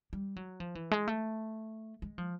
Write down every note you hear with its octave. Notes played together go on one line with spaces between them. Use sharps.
G3
F#3
F3
E3
G#3
A3
G#3
F3